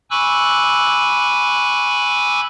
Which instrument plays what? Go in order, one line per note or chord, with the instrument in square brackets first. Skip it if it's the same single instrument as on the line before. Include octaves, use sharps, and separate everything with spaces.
[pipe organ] G#5 B5 C#6 D6 E6 F#6